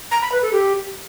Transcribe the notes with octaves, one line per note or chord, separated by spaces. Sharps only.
A#5
B5
B4
A4
G4